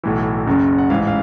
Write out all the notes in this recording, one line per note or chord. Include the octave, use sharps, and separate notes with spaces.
B1 A2 E3
F#1 F#2 C#3
F#5
A1 G#2 E3 F5
F5